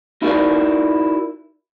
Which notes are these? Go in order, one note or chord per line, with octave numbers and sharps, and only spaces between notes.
D#4 E4 F#4 A4 A#4 D5